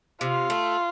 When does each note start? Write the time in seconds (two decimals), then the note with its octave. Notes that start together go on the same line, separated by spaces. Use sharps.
0.21 C3 F4
0.50 A3